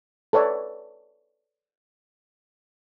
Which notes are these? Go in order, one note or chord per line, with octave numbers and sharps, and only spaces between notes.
A4 B4 C#5 D5